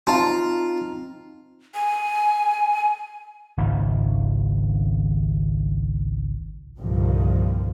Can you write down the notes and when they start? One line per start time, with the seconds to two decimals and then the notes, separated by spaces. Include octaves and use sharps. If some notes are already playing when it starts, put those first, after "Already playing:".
0.07 C4 D#4 F4 A5 A#5
1.75 G#5
3.57 G#1 C#2 D#3
6.78 C2 G2 A#2 D3 D#3 F3